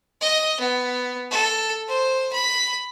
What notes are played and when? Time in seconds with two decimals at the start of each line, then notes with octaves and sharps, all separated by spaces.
0.21 D#5
0.60 B3
1.31 A4
1.88 C5
2.32 B5